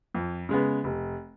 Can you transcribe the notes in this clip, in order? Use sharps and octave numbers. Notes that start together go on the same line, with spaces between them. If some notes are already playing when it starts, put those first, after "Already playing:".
F2
C#3 G#3 B3
F1